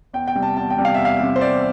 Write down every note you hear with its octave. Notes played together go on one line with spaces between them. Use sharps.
E2 G5
G5
C3 G3
A5
E2 A5
G5
C3 G3
F5
E2 E5
F5
C3 G3
C5
E2 D5